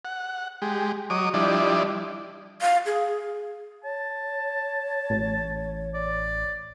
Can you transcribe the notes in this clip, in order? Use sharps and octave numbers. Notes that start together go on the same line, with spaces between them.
F#5
G#3 G4
F#3 C#5 D#5 D6 D#6
F3 G3 D4 E4 D5 D#5
F5
G#4
C#5 A5
A1
D5